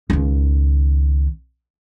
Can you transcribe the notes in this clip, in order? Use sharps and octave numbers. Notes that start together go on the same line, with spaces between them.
C#2 D#3